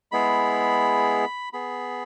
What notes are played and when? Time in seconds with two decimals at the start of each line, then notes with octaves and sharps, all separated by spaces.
0.12 G#3 B3 E4 G#4 B5
1.53 B3 G#4 B5